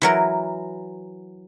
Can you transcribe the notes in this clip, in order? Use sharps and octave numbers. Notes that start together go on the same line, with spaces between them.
E3 F#3 A#4